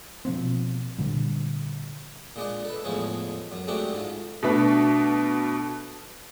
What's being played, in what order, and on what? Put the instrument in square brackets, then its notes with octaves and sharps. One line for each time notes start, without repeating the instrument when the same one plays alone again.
[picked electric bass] B2 F3 A#3 C4
A#2 D3 G3
[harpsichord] A#2 G#3 D4 D#5
A4 B4
E2 A2 F3 G#3 C#4
F#2
G#3 A3 C4 D4 F#4 G4
G#2 F4
[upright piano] B2 A3 D4 B4